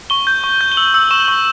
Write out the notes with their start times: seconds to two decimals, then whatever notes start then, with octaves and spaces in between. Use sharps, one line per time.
0.10 C#6 G7
0.27 G6
0.44 C#6
0.61 G6
0.72 G7
0.77 E6 F#7
0.94 E6
1.11 C#6 E7
1.28 C#6